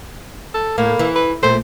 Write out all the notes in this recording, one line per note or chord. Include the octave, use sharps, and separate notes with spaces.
A4
A2 A#3
E3
B4
A#2 A3 C5